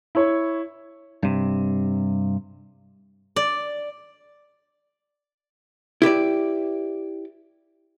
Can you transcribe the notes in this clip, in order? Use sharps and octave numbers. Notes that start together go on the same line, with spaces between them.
E4 C#5
G2 C3
D5
E4 G4 B4 D5